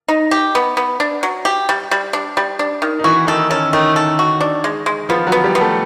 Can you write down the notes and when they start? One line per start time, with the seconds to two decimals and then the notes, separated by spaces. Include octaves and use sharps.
0.08 D#4
0.31 G4
0.55 B3
0.77 B3
1.00 D4
1.23 F#3
1.45 G4
1.69 G3
1.91 G3
2.13 D4
2.37 G3
2.59 D4
2.82 D#3
2.99 D#4
3.04 E3 E4 F#4
3.27 D#3 D#4 A4
3.50 C#4 A4
3.73 D#3 A3 D#4
3.96 A4
4.19 F#4
4.41 D4
4.64 G#3
4.86 G#3
5.09 F3 B3 F4
5.27 F#3 F#4
5.32 B3
5.44 G3 G4
5.55 B3
5.61 A3 A4